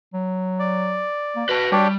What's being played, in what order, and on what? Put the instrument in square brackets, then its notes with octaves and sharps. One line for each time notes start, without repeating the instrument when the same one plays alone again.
[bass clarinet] F#3
[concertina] D5
[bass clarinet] A#3
[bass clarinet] F#4 [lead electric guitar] B4 A5
[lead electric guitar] G3 [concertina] D4 G4 C#5